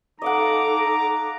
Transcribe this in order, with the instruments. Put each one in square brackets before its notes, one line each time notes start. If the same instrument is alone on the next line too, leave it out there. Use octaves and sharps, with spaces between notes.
[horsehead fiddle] D#4 A4 [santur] D#5 F5 F#5 [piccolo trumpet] A#5 [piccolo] D6